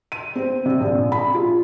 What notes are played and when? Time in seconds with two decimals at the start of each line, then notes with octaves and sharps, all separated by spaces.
0.12 D#7
0.35 C4
0.66 C3
0.81 A#1
1.12 B5
1.35 F4